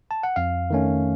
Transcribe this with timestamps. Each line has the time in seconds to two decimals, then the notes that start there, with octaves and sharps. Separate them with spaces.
0.11 A5
0.23 F#5
0.36 F2 F5
0.70 D#3 A3 C#4